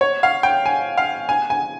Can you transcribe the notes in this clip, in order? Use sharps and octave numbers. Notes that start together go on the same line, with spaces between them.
C#5
F5
G5
G#5
F5
G#5
G#5